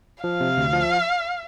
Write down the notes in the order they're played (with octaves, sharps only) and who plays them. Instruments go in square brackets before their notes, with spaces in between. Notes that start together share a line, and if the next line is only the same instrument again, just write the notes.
[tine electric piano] F3 [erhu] F5
[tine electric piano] C3
D2
F3